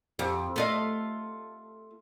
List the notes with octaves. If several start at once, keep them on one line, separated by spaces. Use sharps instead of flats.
F2 G4
A3 F4 D#5